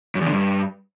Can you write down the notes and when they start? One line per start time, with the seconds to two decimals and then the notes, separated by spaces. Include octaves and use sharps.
0.15 F#2
0.21 E2
0.27 D3
0.32 G2